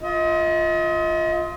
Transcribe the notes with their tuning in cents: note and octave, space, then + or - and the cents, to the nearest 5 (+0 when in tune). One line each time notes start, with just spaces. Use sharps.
F4 +0 D#5 +35